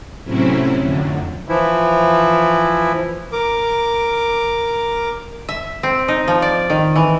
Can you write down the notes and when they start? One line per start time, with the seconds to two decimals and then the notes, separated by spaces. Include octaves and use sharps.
0.24 A2 C3 F#3 C4 C#4 E4
0.77 F2 A2 D3 F#3
1.48 E3 F3 E4
3.32 A#4 D6
5.49 E5
5.83 C4
6.08 D#4
6.28 F3
6.42 D5
6.70 D#3
6.96 E3